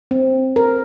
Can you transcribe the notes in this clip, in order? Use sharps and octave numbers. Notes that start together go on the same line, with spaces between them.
C4
A#4